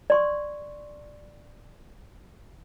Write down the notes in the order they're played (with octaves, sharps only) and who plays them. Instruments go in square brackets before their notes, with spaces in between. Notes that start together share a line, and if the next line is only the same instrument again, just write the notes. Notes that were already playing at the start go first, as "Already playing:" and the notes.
[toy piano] D5 C6 C#6